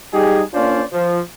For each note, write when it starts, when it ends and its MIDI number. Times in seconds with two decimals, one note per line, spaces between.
0.13 0.42 55
0.13 0.42 63
0.13 0.42 67
0.13 0.42 68
0.54 0.82 58
0.54 0.82 61
0.54 0.82 62
0.54 0.82 65
0.54 0.82 72
0.54 0.82 74
0.92 1.20 53